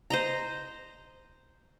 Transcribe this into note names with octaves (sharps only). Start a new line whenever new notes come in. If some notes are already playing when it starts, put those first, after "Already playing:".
C5 D#5 A#5